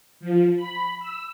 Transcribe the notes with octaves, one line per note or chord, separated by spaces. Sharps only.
F3
B5
E6